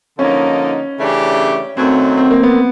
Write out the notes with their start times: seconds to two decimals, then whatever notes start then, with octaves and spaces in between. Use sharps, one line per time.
0.19 D3 F3 A#3 C#4 D#4
0.98 C#3 E3 A3 D4 G4
1.77 F#2 D#3 F#3 A3 C4
2.17 C4
2.31 A#3
2.43 B3